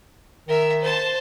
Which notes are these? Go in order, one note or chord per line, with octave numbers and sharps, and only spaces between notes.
D#3 A#4 E5
C5 A5